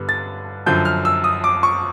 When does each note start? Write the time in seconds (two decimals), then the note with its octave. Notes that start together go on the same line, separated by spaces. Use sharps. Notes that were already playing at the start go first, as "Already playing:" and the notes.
Already playing: G2 D3 G3 B3
0.09 A6
0.66 F#2 D3 F3 G6
0.85 F6
1.05 E6
1.24 D#6
1.44 D6
1.63 C#6